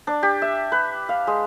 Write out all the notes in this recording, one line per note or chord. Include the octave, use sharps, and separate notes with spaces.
D4
G4
E5
B4
F5
G#3